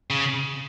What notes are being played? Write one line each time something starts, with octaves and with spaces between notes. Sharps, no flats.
C#3